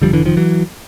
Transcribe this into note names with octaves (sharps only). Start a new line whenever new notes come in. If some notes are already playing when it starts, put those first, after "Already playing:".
F2 D3 F3 G3
F1
D3 E3
D#3 F3
E3 F#3